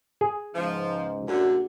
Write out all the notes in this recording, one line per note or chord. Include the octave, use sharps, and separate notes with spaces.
G#4
C#2 G#2 F3
A#1 F#2 A2 D3 F#4